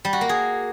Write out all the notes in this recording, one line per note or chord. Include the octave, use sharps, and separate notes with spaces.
G3
F#4
A#3
G#4